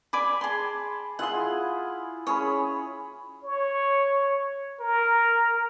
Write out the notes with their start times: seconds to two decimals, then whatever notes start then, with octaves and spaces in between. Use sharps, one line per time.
0.13 D5 G#5 B5 D6
0.41 G#4 A5 C6
1.19 E4 F4 G#4 F#5 C6
2.27 C#4 G#4 C#5 B5
3.44 C#5
4.80 A#4